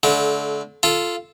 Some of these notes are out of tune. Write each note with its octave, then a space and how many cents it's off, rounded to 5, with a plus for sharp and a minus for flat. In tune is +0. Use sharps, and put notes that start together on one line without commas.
D3 -25 A3 -40
F4 -10 A4 -5